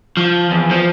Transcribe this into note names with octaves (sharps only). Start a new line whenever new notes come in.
F3
E2
F3